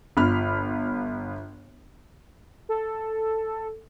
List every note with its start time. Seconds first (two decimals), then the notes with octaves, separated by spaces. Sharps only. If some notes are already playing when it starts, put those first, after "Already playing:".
0.17 G1 F4 B5 F6
2.69 A4